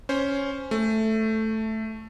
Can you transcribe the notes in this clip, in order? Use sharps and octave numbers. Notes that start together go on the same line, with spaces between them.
C#4 C5
A3